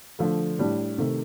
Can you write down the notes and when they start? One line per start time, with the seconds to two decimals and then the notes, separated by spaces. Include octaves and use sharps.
0.19 D3 F3 A3
0.59 A2 G3 D4
0.98 C3 D#3 A3